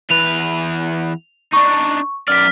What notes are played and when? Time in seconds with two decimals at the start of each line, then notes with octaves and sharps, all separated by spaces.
0.11 E2 B4 F7
1.53 D4 D#4 C#6
2.28 F#2 D5 F6 B6